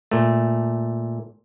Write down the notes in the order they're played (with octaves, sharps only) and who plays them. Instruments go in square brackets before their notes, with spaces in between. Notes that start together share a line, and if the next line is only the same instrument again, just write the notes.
[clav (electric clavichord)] A#2 A3